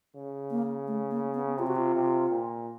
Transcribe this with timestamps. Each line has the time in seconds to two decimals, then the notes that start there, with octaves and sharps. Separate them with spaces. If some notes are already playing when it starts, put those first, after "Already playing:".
0.16 C#3
0.51 A#3
0.87 A3
1.11 A#3
1.34 B3
1.58 C3 F4
1.67 F#4
1.77 F4
1.95 C3
2.30 A#2